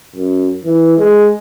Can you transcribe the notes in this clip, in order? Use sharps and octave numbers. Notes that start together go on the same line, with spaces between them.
F#2
E3
G#3